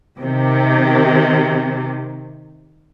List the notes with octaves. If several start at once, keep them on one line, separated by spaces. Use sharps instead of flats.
C3 D#3